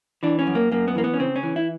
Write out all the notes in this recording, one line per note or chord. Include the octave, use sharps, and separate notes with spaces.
E3 D4
C#4
F#2
A#3
F#2 A#3
B3
E3 A#3
B3
C#4
C#3 C4
C#4
E3
E4